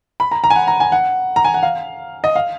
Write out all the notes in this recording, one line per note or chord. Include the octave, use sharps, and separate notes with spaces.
B5
A#5
A#5
G#5
F#5
A#5
G#5
F#5
A#5
G#5
F#5
F5
D#5
F5